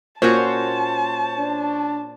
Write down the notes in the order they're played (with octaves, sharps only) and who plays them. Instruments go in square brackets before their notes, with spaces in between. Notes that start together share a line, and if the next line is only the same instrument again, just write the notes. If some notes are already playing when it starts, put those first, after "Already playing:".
[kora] A#2 C#4 F#4 [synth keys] C5 C#5 [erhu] A5
[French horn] D4